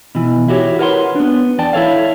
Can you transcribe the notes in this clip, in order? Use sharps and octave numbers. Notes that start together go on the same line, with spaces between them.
B2 E3
E4 F#4 G4 C#5
A#4 B4 C#5 F#5 G#5 C6
B3 D4
E2 D5 G5 A5
E4 A4 C#5 F5